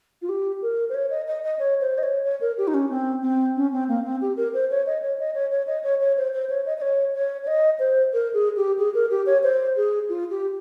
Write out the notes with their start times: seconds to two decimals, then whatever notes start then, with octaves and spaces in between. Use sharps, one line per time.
0.22 F4
0.29 G4
0.62 A#4
0.89 C5
0.94 C#5
1.10 D#5
1.28 D#5
1.44 D#5
1.59 C#5
1.81 C5
1.98 D#5
2.03 C#5
2.25 C#5
2.41 A#4
2.58 G4
2.67 D#4
2.74 C#4
2.90 C4
3.22 C4
3.56 C#4
3.72 C4
3.88 A#3
4.05 C4
4.21 G4
4.37 A#4
4.54 C5
4.70 C#5
4.86 D#5
5.02 C#5
5.19 D#5
5.34 C#5
5.51 C#5
5.67 D#5
5.83 C#5
6.01 C#5
6.17 C5
6.33 C5
6.49 C#5
6.66 D#5
6.78 D#5
6.82 C#5
7.15 C#5
7.44 C#5
7.47 D#5
7.79 C5
8.13 A#4
8.34 G#4
8.57 G4
8.78 G#4
8.94 A#4
9.10 G4
9.26 C#5
9.43 C5
9.76 G#4
10.09 F4
10.30 G4